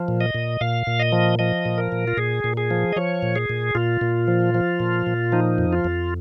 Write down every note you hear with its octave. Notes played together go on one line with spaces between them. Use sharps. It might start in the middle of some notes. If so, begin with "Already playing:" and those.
Already playing: F3
A#2
D#5
A#2
A#2 F5
A#2
D#5
F3
F3 D#5
A#2
A#4
A#2
F4
A#2 G#4
A#2
G#4
F3
D#5
F3 C#5
A#2
G#4
A#2
A#2 F4
A#2
F3
F3
A#2
A#2
F3 D#4
F2
F4
F2